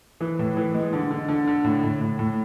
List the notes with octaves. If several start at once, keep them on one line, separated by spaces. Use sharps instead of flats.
E3
A2
E3
G#3
D3
D3
D3
D3
A2
A2
A2
A2